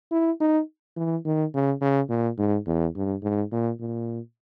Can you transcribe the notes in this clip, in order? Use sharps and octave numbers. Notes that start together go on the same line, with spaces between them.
E4
D#4
E3
D#3
C#3
C#3
A#2
G#2
E2
G2
G#2
A#2
A#2